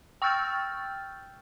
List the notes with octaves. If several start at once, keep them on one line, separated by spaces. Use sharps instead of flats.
G5 C#6 E6 F6 G6 A6